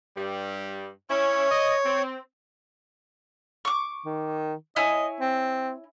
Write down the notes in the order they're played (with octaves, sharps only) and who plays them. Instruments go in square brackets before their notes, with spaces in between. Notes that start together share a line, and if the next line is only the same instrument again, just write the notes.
[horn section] G2 G3
[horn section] C#4 E4 [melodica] C#5
[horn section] D#5
C4
[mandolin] C#6 D6
[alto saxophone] D#3
[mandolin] E4 C#5 G#5 [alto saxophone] D#5
[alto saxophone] C4